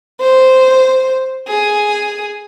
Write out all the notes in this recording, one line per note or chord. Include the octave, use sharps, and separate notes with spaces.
C5
G#4